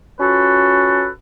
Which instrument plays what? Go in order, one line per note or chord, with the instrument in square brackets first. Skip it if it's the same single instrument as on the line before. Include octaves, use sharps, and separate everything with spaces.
[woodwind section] C#4 F4 F#4 A4 B4